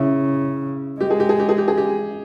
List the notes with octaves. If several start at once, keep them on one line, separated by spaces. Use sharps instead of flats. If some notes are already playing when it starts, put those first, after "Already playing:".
Already playing: C#3 E4
G#3 G4
G#4
G4
G#4
G4
G#4
G4
G#4
G4